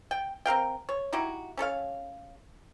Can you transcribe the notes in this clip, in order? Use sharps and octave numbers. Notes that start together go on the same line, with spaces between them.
G5
C4 A#4 F5 G5
C#5
D#4 E4 F#4 G4
C#4 A4 C#5 F5